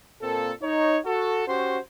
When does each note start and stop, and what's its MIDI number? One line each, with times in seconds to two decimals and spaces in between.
0.21 0.52 46
0.21 0.52 58
0.21 0.52 60
0.21 0.52 69
0.61 0.97 63
0.61 0.97 73
1.05 1.46 66
1.05 1.46 69
1.48 1.78 61
1.48 1.78 66
1.48 1.78 67
1.48 1.78 72